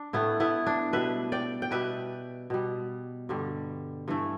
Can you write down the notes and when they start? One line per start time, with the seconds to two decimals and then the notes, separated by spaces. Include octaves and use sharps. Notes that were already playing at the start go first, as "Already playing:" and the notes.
Already playing: D4
0.13 A2 A3 B3 E4
0.40 B3 E4
0.66 D4
0.93 B2 G3 B4 E5
1.32 D5 G5
1.62 G5
1.71 B2 G3 B4 E5
2.50 B2 G3
3.29 G2 D3 G3
4.08 G2 E3 A3